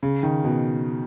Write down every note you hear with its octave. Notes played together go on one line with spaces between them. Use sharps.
C#3
D#3
B2